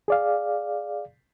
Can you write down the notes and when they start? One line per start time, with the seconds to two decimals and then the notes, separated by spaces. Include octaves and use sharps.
0.08 G#4 D5 F5